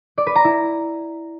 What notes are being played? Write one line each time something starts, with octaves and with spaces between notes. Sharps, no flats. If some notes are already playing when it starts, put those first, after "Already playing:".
D5
B4
A#5
E4